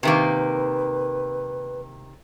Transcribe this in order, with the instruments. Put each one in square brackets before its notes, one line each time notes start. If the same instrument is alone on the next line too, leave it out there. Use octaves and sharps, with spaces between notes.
[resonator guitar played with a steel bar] C3 D#3 A#3 [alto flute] B4